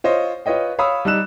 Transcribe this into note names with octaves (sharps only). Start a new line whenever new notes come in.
F4 C5 C#5 D#5
F4 B4 C#5 D#5 G5
C#5 F5 B5 D#6 E6
G3 D#4 E6 F#6 E7